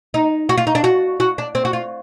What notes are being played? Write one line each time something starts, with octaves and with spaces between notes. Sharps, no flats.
D#4
F#4
F4
D#4
D4
F#4
F#4
D4
C4
F#4
F4